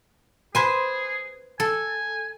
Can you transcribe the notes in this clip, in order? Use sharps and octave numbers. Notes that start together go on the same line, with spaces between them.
G#4 B4 C5 G#5
A4 G#5